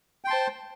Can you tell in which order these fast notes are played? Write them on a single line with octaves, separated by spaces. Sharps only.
G5 C6 A5 C5